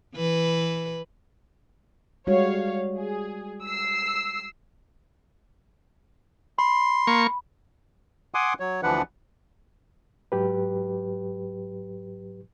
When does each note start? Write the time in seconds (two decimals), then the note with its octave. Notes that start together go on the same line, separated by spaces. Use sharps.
0.15 E3 B4
2.27 G3 G#3 F#4 C#5 F5
2.96 G#4
3.65 E6 C7
6.59 B5 C6
7.07 A#3 C#6
8.34 F#5 G#5 C6 D6 D#6
8.60 F#3 C#5
8.83 D2 E3 F3 D4 B4 F#5
10.32 G#2 F#3 G4 B4